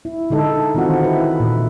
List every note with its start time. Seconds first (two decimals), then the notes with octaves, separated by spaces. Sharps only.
0.05 E4
0.30 D3 G#3 D#4 A4
0.74 D#3 E3 C4 F4 F#4 F#5
1.04 E4 B4
1.40 A#2